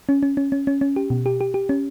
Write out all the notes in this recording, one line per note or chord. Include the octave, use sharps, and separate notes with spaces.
C#4
C#4
C#4
C#4
C#4
C#4
G4
B2
G4
G4
G4
C#4